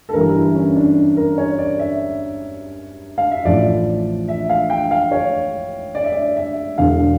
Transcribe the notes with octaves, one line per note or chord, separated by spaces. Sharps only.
A4
G1 G2 E3 G3 A#4
E4
C#4
D4
A#4
C#5
D5
E5
F5
E5
A1 A2 F3 D5
E5
F5
G5
F5
C#5
D5
E5
D5
E5
E1 E2 D3 F5